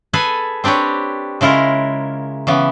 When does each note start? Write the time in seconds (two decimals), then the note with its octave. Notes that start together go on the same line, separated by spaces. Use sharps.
0.13 G#4 A4 B4 G#5
0.64 C4 D4 G4 B4 C#5
1.41 C#3 G#3 E4 F4 A#4
2.47 C#3 E3 B3